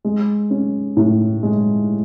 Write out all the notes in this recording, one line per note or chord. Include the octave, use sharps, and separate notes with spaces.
G#3
C#4
A2
G#3